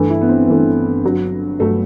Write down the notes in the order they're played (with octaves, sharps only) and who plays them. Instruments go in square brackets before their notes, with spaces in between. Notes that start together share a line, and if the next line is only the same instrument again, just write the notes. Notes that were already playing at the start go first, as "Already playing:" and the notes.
Already playing: [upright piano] G1 G2 E3 A3
[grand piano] E4
B3
C4
[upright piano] G1 G2 E3 A3
G1 G2 F#3
[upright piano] G1 G2 F#3 [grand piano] A3